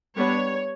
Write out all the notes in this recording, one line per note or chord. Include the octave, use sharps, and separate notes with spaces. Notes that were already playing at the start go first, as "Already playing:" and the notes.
G3 B3 D4 C#5